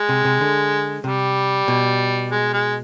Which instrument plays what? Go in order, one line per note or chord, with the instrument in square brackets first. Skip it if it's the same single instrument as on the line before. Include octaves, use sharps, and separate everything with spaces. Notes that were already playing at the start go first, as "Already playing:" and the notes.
Already playing: [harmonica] G#3
[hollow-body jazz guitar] C3
C3
D3
[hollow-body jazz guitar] C3 [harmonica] G3
[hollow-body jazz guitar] B2
[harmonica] G#3
G#3